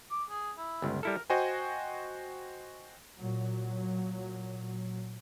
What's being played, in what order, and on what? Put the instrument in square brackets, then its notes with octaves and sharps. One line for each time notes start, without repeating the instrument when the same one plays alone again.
[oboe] D6
G#4
E4
[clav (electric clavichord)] G1 C#2
[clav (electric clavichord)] G3 E4 A4 [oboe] A#4
[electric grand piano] F#4 C5 D#5 G5 G#5
[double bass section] A#2 F#3